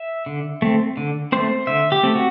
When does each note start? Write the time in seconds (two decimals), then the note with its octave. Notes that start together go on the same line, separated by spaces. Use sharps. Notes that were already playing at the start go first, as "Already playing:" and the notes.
Already playing: E5
0.26 D3
0.62 A3 C4
0.97 D3
1.32 A3 C4 C5
1.67 D3 E5
1.92 G4
2.03 A3 C4
2.15 F#4